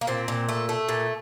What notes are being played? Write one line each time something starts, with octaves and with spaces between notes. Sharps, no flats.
A#3
A#2 C4
A#2
A3
A3
A#2